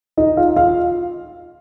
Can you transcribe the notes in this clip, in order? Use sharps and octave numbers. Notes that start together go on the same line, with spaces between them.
D#4 D#5
F4 F5
F4 F5